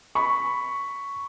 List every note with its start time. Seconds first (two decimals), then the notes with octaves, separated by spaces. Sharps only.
0.15 B5 C#6